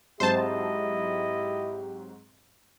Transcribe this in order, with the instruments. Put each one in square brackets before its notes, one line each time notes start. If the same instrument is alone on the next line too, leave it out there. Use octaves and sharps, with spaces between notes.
[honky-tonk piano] G#2 F#3 C4 [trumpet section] E4 D#5 [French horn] G4 [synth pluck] C5 A5